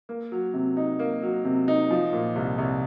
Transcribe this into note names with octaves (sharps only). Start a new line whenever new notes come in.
A#3
F#3
C3
D#4
A#3
F#3
C3
D#4
F3
A#2
C2
C2